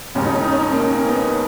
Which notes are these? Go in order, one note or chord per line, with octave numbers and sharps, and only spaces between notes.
E1 D#2 C#3 C#4
D#4
C#4
D#4
C#4
D#4
A#3 C#4
C#4
B3 D#4